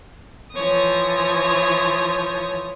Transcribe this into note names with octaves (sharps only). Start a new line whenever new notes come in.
E3 F3 C#5 D#6